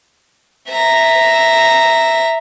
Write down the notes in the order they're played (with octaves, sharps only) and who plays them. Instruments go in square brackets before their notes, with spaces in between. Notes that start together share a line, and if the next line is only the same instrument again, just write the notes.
[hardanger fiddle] E5 A#5